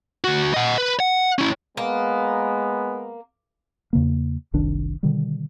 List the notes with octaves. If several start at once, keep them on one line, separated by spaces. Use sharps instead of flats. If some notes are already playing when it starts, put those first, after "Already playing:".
D2 F#4
D#5 F#5
B4
F#5
C#4 E4
G#3 A#3 B3
E2 C#3 A#3
F#1 C2 D#3 D4
B2 D3 D#3 G3